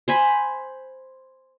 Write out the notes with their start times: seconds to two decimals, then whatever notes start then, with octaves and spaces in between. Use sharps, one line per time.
0.08 C5 G#5 B5